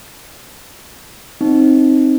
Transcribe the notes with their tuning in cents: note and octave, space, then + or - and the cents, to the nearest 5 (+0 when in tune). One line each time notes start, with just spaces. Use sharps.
C4 +20 D#4 +0